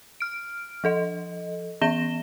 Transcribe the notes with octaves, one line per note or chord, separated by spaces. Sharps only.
F6 D7
F3 A4 D#5
E3 B3 E5 A#6 E7 G7